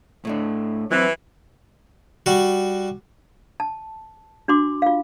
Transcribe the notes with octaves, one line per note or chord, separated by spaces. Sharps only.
A2 A3 D4
E3 F#3 C4
G3 F#4
A5
D4 F#4 C6 D6
F4 F5